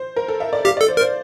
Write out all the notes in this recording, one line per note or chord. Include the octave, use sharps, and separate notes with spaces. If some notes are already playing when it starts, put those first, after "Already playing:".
Already playing: C5
A#4
A4
E5
D5
G4 F5
D5
A4
C5
A#4
C5